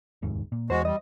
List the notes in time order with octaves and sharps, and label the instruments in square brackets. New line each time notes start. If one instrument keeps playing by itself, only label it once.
[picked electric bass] F1 D#2 G#2
A#2
[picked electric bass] E2 [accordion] G#3 F#4 [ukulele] C5
[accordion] G3 [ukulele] D#5